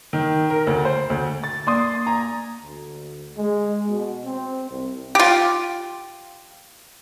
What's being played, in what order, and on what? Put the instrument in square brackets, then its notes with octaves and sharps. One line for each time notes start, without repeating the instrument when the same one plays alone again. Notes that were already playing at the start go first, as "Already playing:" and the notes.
[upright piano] D#3
A#4
D2
C5
D2
A6
[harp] A#3 D4 [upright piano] D5 C6 D#6
[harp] G#5 [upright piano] A#5
[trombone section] D2
G#3
B2
C4
C2
[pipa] F4 G4